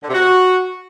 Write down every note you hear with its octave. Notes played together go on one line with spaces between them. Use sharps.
D3
C3
F#4